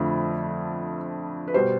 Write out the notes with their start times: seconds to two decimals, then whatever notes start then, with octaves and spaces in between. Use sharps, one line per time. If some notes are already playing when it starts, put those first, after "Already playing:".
Already playing: F2 D3 F3 A3 B5
1.48 B4
1.54 B2 G3 C5